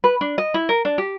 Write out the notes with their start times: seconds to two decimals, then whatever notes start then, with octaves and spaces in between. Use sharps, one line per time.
0.04 B4
0.21 D4
0.38 D#5
0.54 E4
0.69 A#4
0.85 D4
0.98 G4